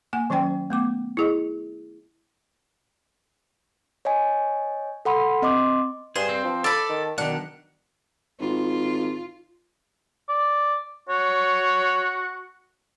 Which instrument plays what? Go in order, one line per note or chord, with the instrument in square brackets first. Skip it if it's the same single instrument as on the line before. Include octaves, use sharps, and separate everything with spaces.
[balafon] A#3 F#5 G#5
D#3 F#3 C#4 C5 G5 C6
A3 B3 D6
E4 G#4 D#5
[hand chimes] C#5 D#5 G#5
A4 F#5 B5 C6
C4 D#5 C6 D6
[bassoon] G2 [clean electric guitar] G#4 [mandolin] C5
[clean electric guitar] C4
[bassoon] F3
[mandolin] A4 B5 [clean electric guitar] D5
[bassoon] D#3
[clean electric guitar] B1 D#3 [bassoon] D4 [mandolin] F#5
[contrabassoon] G#1 [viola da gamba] F4
[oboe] D5
[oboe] F#4 [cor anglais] C#5